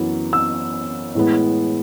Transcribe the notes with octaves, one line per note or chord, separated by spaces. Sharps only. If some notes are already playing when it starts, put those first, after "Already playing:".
Already playing: F#2 E3 B3
E6
A2 E3 G#3 B3